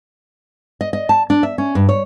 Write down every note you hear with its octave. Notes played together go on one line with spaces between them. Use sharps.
D#5
D#5
A5
D4
E5
C#4
G2
C#5